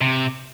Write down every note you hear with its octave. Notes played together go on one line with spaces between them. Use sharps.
C3